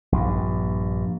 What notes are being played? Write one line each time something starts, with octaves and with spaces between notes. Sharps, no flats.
A#1 G2